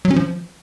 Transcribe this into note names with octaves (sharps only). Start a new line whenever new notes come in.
F#3
C#4
F3